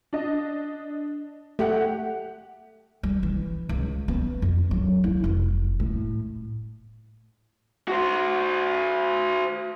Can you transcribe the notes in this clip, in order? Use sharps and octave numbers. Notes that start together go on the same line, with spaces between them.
D4 D#5
A3 G4 F#5
G3
E3
C#2
B3
F2
F#3
E4
F1
A2
F#4 C5